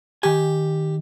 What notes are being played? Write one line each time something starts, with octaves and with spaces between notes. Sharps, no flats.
D#3 G4 G#5